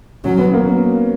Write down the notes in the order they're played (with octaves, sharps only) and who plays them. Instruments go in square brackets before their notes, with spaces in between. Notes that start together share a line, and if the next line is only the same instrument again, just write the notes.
[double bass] F#3 [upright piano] C#4
[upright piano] B3
A#3